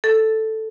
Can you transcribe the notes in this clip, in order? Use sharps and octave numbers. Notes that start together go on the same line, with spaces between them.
A4